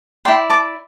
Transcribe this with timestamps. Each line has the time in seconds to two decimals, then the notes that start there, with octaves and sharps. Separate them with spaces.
0.25 E4 A4 D5 G5 C6
0.50 A5 D6